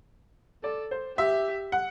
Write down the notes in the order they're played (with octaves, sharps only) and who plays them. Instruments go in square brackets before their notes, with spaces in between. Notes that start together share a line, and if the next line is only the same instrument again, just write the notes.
[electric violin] A4 [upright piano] D5
[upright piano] C5
[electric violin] G4 [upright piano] E5
[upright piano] F#5